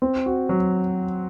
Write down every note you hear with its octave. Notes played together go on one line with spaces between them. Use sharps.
C4
F#4
F#3